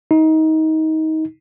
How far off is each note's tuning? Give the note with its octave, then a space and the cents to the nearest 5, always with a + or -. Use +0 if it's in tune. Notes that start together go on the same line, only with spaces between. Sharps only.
D#4 +25